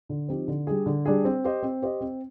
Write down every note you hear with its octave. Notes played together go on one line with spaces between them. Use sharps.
D3
F3 C4 D#4 G4
D3
G3 D4 G#4
D3
G3 D4 G#4
C4
G4 C5 D#5
C4
G4 C5 D#5
C4